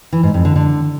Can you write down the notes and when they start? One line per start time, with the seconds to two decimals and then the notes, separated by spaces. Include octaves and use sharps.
0.12 E3
0.23 G#2
0.34 F2
0.45 D3
0.56 D3